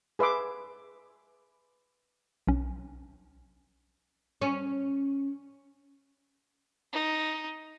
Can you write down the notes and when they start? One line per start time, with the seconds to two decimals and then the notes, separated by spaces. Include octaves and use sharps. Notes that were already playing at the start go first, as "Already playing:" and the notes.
0.19 G#4 B4 E5 C6 D6
2.47 B1 C#4
4.42 C#4
6.93 D#4